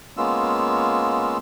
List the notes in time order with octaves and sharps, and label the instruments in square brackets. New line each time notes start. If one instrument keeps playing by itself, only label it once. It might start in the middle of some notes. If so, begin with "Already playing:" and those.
[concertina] G#3 A#3 B3 C#4 F4 E6